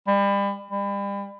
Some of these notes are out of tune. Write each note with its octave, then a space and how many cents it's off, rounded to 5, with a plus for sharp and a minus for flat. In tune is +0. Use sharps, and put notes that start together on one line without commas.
G3 +35
G3 +35